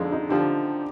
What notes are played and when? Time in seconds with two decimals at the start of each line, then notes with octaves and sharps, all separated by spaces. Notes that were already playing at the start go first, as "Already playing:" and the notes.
Already playing: F2 D3 G#3 D4 D#4
0.12 D#4
0.29 D3 F3 G4